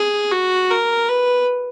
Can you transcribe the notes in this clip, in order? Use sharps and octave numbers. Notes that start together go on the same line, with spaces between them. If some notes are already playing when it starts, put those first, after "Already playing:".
Already playing: G#4
F#4
A#4
B4